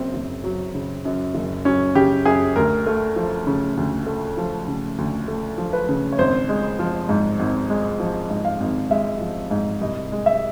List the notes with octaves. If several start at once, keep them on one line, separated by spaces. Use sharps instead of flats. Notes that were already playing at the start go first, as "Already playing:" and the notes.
Already playing: F#1 F#2 C#3 C4
F#1
F#3
C#3
F#2
F#1
F#3 C#4
C#3 G4
F#2 G#4
D2 A#4
A3
F3
C#3
D2
A3
F3
C#3
D2
A3
F3
B4
C#3
C#5
G#1 C5
G#3
F3
G#2
G#1
G#3
F3
G#2
F5
G#1
G#3 E5
F3
G#2
C2 D#5
G#3
E5